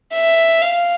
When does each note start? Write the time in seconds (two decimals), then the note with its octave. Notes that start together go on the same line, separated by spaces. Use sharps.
0.14 E5
0.62 F5